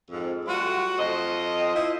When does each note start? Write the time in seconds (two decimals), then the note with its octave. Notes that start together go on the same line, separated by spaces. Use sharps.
0.11 F2 G#2
0.46 F#3 G3 A3 F4 F#4
0.97 F2 C5 D#5
1.74 E4 F4 C5 D#5